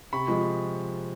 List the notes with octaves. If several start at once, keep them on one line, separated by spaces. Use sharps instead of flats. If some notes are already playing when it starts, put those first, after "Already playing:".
C3 B5 C#6
F3 G#3